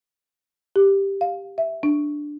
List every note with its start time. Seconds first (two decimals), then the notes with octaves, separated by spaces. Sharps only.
0.76 G4
1.21 F5
1.58 E5
1.83 D4